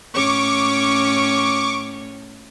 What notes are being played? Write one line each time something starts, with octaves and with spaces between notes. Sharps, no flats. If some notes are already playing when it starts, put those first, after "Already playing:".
A2 C#4 C#5 C#6 D6